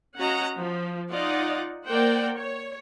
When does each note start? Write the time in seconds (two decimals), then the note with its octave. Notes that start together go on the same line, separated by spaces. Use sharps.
0.20 C#4 F#4 D#5 F5 F#5 A#5
0.58 F3
1.11 D#4 F4 D5 D#5 F#5
1.88 A#3 A#4 C5 D5 F#5 G5
2.38 C#5